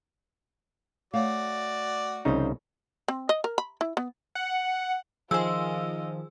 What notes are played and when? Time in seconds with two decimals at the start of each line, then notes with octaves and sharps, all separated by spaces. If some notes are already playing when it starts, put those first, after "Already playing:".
1.13 A3 F#4 C#5 D5 F5
2.25 C2 C#3 F3 C4 D#4
3.08 C4
3.29 D#5
3.44 A#4
3.58 B5
3.81 E4
3.97 B3
4.35 F#5
5.31 D#3 F3 F4 G#4 C5 D#5 G#5 E6